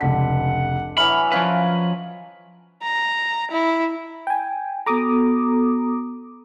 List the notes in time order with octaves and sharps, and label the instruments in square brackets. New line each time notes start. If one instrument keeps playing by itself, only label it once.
[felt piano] F1 C#2 B6 [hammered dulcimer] D3 [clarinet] F#5
[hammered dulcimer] E3 F#3 [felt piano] E5 [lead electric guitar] B5 [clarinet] F6
[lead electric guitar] F3 B4 [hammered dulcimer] C#4 D#5 [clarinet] F5
[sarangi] A#5
E4
[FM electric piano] G5 G#5
[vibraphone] B3 F#4 A4 [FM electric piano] A#5 D6 D#6